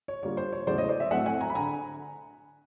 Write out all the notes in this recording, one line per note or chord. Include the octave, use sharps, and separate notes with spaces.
C#5
D3 G3 A#3 D4 F4 C#5
C5
C#5
E2 C#3 F#3 A3 C5 D5
C#5 D#5
C5 D5
D5 E5
A2 F#3 A3 C4 E5 F#5
F#5 G#5
G#5 A#5
B5
D3 G#5 A#5